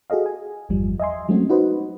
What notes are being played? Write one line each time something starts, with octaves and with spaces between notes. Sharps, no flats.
F#4 G#4 A4 D#5 F5
G#5
G1 E2 F3 G3
D#5 E5 G#5 C6
F#3 G#3 A3 C4 C#4 F#4
D#4 F#4 B4 C5 D#5